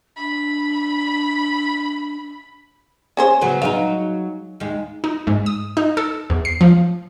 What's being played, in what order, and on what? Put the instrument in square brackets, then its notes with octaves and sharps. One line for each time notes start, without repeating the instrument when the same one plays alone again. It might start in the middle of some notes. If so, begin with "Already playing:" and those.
[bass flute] D4 [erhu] B5
[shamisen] C#4 G#4 C5
[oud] C#3 F#3 B3
[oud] F#3 G#3 D#4 [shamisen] F5
[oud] D#2 G#3
[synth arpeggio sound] D#4
G#2
D#6
D#4
A4
E2
C7
F3